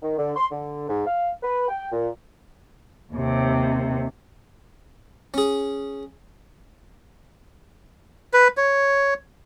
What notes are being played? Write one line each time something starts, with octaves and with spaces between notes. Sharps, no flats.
D#3
D3
C6
D3
G#2
F5
B4
G5
A#2
D#2 C3
C#4 G#4
B4
C#5